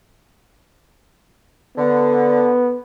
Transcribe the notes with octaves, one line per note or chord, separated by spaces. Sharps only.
D3 B3